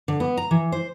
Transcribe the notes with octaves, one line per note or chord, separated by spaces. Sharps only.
D3
B3
A#5
E3
C5